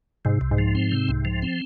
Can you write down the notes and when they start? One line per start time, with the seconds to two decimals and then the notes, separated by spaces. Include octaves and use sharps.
0.25 G#2 C3
0.41 C2
0.51 G#2
0.58 F3
0.75 C4
0.92 C3
1.09 C2
1.25 F3
1.42 C4